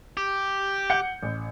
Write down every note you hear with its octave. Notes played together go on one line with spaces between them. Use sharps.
G4
F#5 G6 C#7
A1